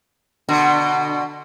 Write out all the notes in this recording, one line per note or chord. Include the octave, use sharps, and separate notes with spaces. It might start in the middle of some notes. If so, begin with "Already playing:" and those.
B2 D3